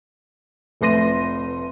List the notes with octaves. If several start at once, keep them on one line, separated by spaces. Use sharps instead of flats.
F1 A3 B4 C6 A#6 D#7